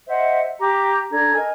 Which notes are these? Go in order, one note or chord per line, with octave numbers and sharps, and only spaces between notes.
C5 D#5 E5 F#5
G4 A#5 D6
D4 A4 A#5 G#6
A#4 D#5 G#5